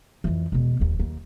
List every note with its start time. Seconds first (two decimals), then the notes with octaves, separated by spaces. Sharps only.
0.24 F2 E3
0.52 E1 B2
0.80 D#1 D#2
0.99 D#2